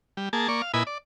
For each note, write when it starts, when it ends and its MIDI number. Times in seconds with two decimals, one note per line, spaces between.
0.17 0.29 55
0.33 0.48 58
0.33 0.48 68
0.33 0.48 81
0.48 0.62 58
0.48 0.62 74
0.48 0.62 85
0.62 0.72 77
0.74 0.83 46
0.74 0.83 64
0.74 0.83 71
0.74 0.83 75
0.74 0.83 80
0.74 0.83 83
0.87 0.98 74